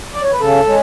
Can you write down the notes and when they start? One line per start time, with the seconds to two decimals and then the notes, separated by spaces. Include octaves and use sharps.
0.13 D5
0.22 C#5
0.32 B4
0.40 C#3 A4
0.66 G#3 C#4